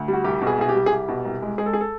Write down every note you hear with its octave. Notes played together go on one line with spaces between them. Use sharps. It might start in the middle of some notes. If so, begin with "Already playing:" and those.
Already playing: D2
G3
F#4
C2 G4
B2
G#4
C2 G#4
G4
G3
G#4
C2 G4
B2
C2
G#3
G#3 G#4
A4
G#4
A4